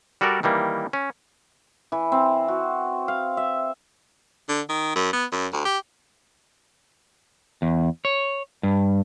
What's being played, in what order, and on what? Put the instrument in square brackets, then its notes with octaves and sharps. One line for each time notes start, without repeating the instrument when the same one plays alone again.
[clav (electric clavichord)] G3 F#4 A4 A#4 D5
D#3 E3 G3 A#3
C#4
[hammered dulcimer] E3
C4
F#4
F5
E5
[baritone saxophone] D3
D#3
F#2
B3
F#2
D2
G4
[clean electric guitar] E2
C#5
G2